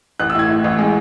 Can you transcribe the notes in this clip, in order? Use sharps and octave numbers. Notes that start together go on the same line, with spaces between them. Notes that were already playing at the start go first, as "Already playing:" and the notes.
A1 F#6
E6
A2 G#6
A2
A1
G#3